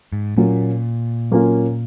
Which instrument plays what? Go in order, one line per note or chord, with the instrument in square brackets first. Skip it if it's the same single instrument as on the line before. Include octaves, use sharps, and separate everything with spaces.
[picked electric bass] G#2
[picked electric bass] A#2 [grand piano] F#3 A#3 C#4 F4
[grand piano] F#3 A#3 C#4 F4